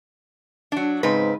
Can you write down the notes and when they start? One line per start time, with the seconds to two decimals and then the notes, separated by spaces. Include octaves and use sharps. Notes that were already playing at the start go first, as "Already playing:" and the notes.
0.72 F#3 D4
1.03 G#2 C#3 C4 B4